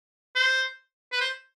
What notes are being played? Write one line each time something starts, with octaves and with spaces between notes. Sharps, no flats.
C5
B4
C5